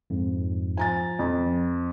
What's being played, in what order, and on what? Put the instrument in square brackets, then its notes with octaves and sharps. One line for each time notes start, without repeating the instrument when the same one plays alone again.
[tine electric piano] F2 G#2
[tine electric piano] F3 [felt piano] G#5 A#5 A6
[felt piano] F2